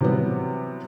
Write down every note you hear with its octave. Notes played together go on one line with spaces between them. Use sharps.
C3 E3 F#3 G3 B3